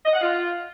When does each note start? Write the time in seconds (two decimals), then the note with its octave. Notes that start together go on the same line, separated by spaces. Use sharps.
0.06 D#5
0.14 F#5
0.21 F4